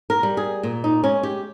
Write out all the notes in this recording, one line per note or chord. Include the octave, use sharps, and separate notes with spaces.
A#4
G3
G#4
A#2
D#4
G#3 C#4
G4